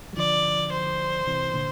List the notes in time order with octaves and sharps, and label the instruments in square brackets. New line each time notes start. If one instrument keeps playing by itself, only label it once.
[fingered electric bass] G3
[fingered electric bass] D3 F3 [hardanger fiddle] D5
[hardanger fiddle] C5
[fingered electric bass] C3 E3
A#2 D3